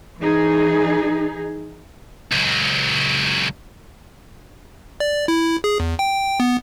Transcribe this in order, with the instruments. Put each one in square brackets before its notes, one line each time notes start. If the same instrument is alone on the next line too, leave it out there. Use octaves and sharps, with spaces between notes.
[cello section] E3 D#4 G#4
[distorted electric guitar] C#2 F#3
[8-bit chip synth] D5
E4
G#4
E2
G5
B3